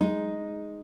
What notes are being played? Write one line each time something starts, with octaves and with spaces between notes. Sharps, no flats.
G#3 D#4